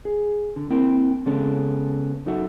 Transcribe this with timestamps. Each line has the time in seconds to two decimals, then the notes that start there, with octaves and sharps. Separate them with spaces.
0.05 G#4
0.56 D3
0.70 A#3 C4 E4 A#4 G5
1.26 C#3 G#3 B3 C#4 A4
2.26 F#2 D#4 F#4 A4 E5 F#5